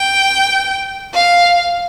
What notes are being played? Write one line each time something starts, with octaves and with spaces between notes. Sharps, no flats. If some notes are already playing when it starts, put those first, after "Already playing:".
Already playing: G5
F5